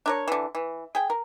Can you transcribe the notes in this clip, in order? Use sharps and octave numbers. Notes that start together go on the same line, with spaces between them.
D4 A#4 C#5
D3 E3
E3
G#4 G5
A#4